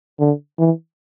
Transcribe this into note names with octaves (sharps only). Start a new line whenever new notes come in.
D3
E3